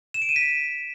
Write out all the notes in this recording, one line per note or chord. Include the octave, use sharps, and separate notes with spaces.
E7
D7
D#7
B6